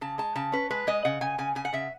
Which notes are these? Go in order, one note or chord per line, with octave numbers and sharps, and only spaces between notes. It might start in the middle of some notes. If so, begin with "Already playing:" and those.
C#3 A5
G#3 A5
C#3 A5
C#4 B4
G#3 B4
G#3 D#5
C#3 F#5
C#3 G#5
C#3 G#5
C#3 G#5
F#5
C#3 E5